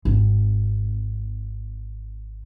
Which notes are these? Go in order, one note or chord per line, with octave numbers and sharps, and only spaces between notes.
G#1 C4